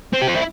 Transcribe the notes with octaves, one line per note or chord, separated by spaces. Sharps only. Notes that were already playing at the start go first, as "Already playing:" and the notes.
C4
G4
F4
E4